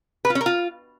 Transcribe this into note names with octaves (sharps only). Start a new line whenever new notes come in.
B4
F4
C#4
A#4
F4